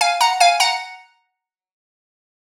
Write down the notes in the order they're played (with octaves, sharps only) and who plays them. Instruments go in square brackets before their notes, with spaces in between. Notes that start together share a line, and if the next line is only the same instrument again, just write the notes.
[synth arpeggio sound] F5 G#5
F#5 A#5
F5 G#5
F#5 A#5